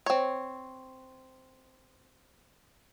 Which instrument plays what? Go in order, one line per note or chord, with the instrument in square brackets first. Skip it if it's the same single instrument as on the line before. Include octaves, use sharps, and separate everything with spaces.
[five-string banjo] C4 C#5